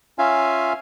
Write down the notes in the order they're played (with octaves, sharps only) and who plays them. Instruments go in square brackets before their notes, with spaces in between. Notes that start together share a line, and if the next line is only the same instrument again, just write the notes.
[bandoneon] C#4 F4 E5 F5 G#5